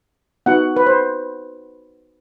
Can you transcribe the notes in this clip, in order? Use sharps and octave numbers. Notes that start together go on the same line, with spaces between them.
B3 D#4 F#4 F#5
B4
C5